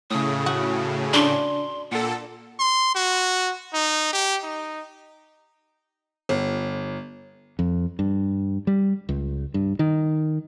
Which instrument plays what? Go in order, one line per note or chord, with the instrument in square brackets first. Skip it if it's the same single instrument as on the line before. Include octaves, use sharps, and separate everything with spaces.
[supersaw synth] A2 C#3 [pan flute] D#6
[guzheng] F#4
[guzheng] D4 [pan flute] C6
[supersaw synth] A#2 A4 [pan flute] F#5
[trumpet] C6
F#4
D#4
G4
D#4
[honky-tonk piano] G1
[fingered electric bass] F2
G2
G3
C#2
G2
D#3